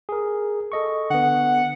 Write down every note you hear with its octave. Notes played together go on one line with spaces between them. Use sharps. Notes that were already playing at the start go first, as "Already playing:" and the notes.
G#4 A#4
A4 D#5 C#6
D3 B3 F#5